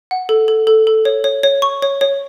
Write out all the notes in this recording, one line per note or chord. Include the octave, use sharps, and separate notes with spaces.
F#5
A4
A4
A4
A4
C#5
C#5
C#5
C#6
C#5
C#5